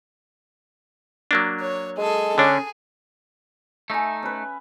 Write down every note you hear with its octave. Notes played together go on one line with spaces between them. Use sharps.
F#3 A#3 D4
C#5
G#3 G#4 A4
D3 C#4 D4 G#4
A3 D#4 E5 G#5
C#4 B4